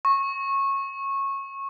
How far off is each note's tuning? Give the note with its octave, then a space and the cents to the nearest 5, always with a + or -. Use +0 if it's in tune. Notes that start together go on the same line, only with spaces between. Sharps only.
C#6 -20